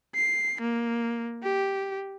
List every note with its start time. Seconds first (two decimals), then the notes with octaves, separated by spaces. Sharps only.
0.15 C7
0.62 A#3
1.43 G4